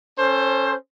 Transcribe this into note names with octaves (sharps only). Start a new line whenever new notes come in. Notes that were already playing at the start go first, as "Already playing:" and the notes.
C#4 A4 C5